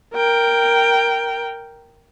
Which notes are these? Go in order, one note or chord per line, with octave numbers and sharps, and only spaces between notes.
A#4 G5